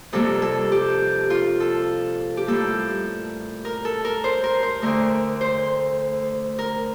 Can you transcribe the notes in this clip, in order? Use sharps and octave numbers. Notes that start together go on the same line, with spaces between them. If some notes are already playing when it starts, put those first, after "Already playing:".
F2 C3 G3 A#3 A4
A4
G4
F4
A4
G4
A2 G3 A#3 A4
A#4
A4
A#4
C5
A#4
C5
D2 D3 A3 A#4
C5
A#4